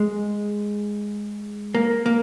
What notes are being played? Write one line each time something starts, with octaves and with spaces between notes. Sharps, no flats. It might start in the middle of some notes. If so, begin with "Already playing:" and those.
Already playing: G#3
A#3
A#3